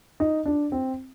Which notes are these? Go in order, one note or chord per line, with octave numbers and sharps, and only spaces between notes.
D#4
D4
C4